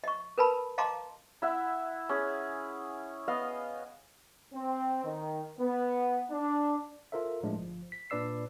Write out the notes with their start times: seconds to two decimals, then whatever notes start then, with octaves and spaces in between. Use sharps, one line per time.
0.04 D#5 C#6
0.38 A#4 B4 A5 B5
0.78 D#5 F5 A5 A#5 C6 D6
1.42 E4 E5 F#5
2.09 C#4 G#4
3.28 B3 D#5 F5
4.53 C4
5.04 D#3
5.59 B3
6.30 D4
7.12 F4 A4 A#4 C5 E5
7.43 A2 F3 G#3 A3 D4
7.55 G1 F3
7.92 B6
8.10 A#2 D4 B4 D5 E6 C7